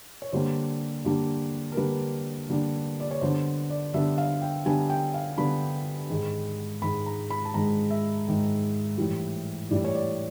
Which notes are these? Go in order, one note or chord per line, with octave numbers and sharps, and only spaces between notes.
C#5
D3 G3 A#3 D4 C5
D3 G3 A#3 D4
A#4
D3 G3 A#3 D4 B4
D3 G3 A#3 D4
D5
C#5
D3 G3 B3 D4 C5
D5
D3 G3 B3 D4 E5
F5
G5
D3 G3 B3 D4 G#5
G5
F5
D3 G3 B3 D4 B5
G#2 D#3 G#3
G#2 D#3 G#3 B5
A#5
B5
A5
G#2 D#3 G#3 A#5
E5
G#2 D#3 G#3
A2 E3 G3
A2 E3 G3 D5
C#5
D5